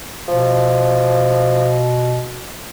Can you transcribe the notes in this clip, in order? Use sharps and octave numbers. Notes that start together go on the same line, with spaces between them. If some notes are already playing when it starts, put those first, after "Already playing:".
B2 F3